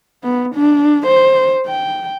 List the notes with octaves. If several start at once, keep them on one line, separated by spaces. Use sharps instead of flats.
B3
D4
C5
G5